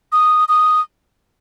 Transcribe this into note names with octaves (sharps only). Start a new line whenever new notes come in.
D#6
D#6